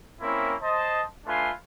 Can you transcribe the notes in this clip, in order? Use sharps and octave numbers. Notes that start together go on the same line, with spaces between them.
A#3 C4 C#4 E4
C5 D#5 A5
A3 D4 F4 B4 G#5 C6